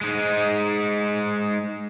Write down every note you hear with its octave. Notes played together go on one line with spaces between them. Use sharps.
G#3 D#4